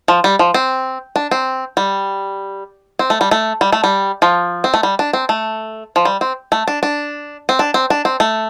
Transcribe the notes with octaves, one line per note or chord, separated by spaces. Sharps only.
F3
G3
F3
C4
D4
C4
G3
C4
A3
G3
A3
G3
A3
G3
F3
C4
A3
G3
D4
C4
A3
F3
G3
C4
A3
D4
D4
C4
D4
C4
D4
C4
A3